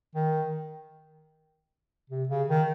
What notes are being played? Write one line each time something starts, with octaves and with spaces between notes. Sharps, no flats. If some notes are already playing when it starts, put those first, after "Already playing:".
D#3
C3
C#3
D#3